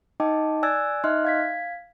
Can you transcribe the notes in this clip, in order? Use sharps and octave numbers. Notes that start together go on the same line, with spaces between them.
D#4 D#5 G5 A5 D6
D5 G#5 E6 F#6 G#6 A6
D#4 D#5 E5 C6 F6 F#6
F5 G#6 B6